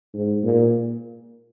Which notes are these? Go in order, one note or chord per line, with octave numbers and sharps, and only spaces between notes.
G#2
A#2